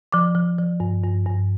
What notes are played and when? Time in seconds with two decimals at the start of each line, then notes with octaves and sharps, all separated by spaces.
0.12 F3 D6
0.35 F3
0.58 F3
0.80 G2
1.04 G2
1.26 G2